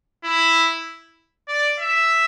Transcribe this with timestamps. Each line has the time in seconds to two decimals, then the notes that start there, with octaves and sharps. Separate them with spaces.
0.24 E4
1.48 D5
1.79 E5